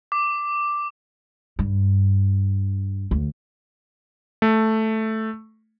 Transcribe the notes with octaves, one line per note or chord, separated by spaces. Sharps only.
D6
G2
D2
A3